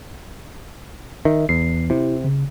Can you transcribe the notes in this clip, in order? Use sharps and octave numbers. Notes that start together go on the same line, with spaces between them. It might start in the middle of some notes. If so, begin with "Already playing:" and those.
D#3 E5
E2 C7
C3 E4 G4
C#3